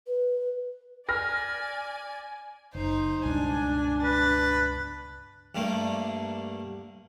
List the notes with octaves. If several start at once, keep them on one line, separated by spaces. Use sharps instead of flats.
B4
D5 G#5 F6 A#6
F#1 D#4 C5
C#2 G2 B2 D4 G#5
B4 A6
G2 D3 A3 A#3